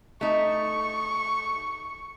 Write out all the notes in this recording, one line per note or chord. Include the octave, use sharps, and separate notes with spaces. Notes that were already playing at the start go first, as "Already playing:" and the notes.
A3 D#4 C#6